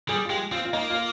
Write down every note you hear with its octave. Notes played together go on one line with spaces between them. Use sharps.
G3 G#4
F4
G#3 G4
C4 F4
F4
A#3 D#4
F4